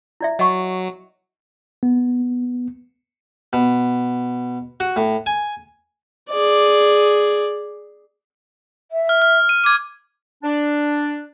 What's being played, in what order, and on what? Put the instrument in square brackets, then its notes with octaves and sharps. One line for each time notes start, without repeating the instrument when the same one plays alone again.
[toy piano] E4 D5 E5
[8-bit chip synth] F#3 [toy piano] D#5 F#5 C#6
[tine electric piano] B3
[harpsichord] B2
F#4
A2
G#5
[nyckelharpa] G#4 D5
[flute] E5
[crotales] F6
F6
D#7
[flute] D6 [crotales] G#6 D#7
[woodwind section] D4